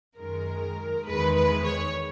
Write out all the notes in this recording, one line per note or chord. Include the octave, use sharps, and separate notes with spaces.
F#2 D#3 G#3 A#4
E2 D#3 G#3 B4
B4
C#5